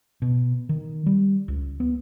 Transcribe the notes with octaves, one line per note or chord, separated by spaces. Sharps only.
B2
D#3
G3
C#2
B3